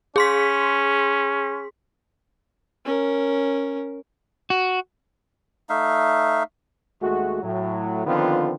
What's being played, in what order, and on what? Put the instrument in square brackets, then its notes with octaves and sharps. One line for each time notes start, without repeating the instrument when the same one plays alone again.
[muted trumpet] C#4 [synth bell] G#4 C6 B6
[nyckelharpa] C#4 A#4
[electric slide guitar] F#4
[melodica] A3 D#4 E5 F5
[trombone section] D#2 G#3 A3 F#4
A2 F#3
D3 D#3 F3 B3 C4 F4